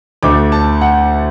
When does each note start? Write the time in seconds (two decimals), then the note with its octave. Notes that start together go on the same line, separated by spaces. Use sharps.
0.23 D2 D3 A3 D6
0.52 A5
0.81 F#5